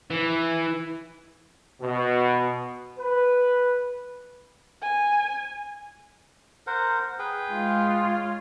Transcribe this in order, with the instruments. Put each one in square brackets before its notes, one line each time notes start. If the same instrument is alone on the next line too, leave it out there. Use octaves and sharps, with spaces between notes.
[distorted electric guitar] E3
[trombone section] B2
B4
[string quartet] G#5
[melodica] A#4 C5 F#5
G#4 B4 G5
[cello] G#3 F4
[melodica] C#5